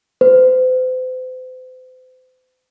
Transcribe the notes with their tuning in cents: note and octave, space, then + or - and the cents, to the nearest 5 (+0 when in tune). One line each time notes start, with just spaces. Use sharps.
C5 -40